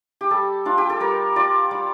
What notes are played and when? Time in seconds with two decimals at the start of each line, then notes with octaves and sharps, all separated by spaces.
0.21 G4
0.31 G3 A4
0.65 D4 F4
0.78 G4
0.90 A4
1.00 G3 A#4
1.36 F4 D5
1.71 G3